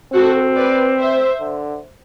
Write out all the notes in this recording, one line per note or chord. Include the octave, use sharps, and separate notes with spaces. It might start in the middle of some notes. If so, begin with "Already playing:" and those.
C4 F#4 A4
B4 D5
C5 E5
D3